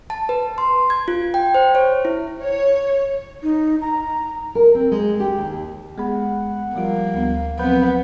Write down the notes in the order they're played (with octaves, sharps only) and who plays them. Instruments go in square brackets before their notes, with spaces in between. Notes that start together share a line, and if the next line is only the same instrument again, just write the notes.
[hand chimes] A5
B4
C6
G#6
F4
G5
C5
C#5
E4
[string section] C#5
[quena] D#4
A#5
[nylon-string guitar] A#4
C4
G#3
G4
D#2
[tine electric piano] G#3 B3 B5 [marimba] G#4 [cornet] F#5
[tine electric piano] F3 G3 F4 [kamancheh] A#3
[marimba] D2 B3
[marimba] F3 F#3 C4 [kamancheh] B3 [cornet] B4 [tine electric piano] C5 B5 G6